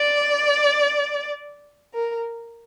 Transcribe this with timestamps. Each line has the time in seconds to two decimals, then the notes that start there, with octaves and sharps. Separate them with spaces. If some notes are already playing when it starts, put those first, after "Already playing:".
Already playing: D5
1.94 A#4